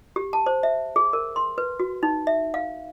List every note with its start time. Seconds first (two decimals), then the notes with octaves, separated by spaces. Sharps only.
0.16 G4
0.33 A5
0.46 C5
0.63 E5
0.96 G#4
1.13 A#4
1.36 C6
1.58 B4
1.80 F#4
2.03 D#4
2.27 E5
2.54 F5